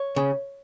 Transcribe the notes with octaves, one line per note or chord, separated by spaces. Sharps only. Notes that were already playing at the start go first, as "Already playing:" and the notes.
Already playing: C#5
C#3